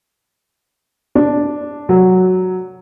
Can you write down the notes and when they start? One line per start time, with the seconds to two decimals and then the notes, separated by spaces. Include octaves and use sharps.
1.15 D4
1.89 F#3